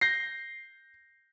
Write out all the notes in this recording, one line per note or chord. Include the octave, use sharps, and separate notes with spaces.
G6 A#6 C7